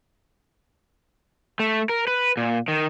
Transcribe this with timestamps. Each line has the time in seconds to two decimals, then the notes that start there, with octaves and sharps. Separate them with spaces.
1.60 A3
1.89 A#4
2.07 B4
2.37 A#2
2.68 D#3